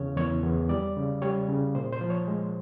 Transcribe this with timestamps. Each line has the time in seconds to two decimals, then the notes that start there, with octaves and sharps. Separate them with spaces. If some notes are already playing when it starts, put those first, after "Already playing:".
Already playing: E2 C#3 C#5
0.16 E2 C#5
0.43 E2
0.69 G3 D5
0.96 C#3
1.22 G3 C#5
1.48 C#3
1.75 A#2 C5
1.93 C5
2.01 F3
2.10 C#5
2.28 G#3